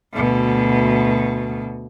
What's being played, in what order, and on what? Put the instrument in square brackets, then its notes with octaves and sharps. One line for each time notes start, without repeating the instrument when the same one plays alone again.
[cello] D2 B2